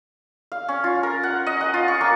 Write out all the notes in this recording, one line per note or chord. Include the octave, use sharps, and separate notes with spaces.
F5
C#4
F4
A#4
F#5
D#5
F#5
F4
C#6
A#3